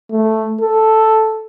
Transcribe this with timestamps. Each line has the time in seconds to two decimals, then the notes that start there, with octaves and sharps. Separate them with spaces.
0.11 A3
0.61 A4